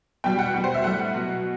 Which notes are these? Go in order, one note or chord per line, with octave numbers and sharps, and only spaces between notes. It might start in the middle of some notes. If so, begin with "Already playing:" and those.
B2 G3 G5
F#5
B2 G3
C5
E5
A2 G3 F#5
B2 F#3